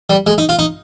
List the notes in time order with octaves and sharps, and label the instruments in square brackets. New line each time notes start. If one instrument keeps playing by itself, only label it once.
[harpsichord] G3
G#3
D#4
F4
D#4